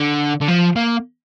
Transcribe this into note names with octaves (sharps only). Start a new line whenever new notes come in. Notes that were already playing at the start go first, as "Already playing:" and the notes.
Already playing: D3
D3
F3
A#3